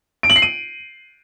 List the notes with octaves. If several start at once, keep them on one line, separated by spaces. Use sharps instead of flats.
D7
F#7
C7
D#7